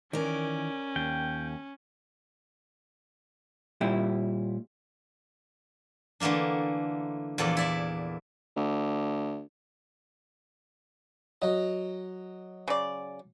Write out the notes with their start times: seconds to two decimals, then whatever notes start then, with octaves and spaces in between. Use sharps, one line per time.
0.13 D#3 E3 C#4 A#4 D5
0.96 D#2 G5
3.81 A#2 G3 E4
6.20 D3 E3 A3 A#3 D4
7.38 E2 A#2 F3 A4 D5
7.57 E4 D5 E5
8.57 D2
11.42 F#3 D#5
12.68 C#3 D5